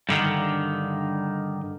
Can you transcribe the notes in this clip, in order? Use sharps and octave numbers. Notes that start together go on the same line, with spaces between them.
G2 D3 D#3